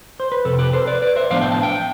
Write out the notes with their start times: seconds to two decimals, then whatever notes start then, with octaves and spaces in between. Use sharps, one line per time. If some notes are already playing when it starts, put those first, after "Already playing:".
0.20 C5
0.32 B4
0.45 F2 C3 A4
0.59 G4 B4
0.73 A4 C5
0.87 B4 D5
1.02 B4 D5
1.16 C5 E5
1.30 A2 F3 B3 D4 D5 F5
1.41 E5 G5
1.52 F5 A5
1.62 E5 G5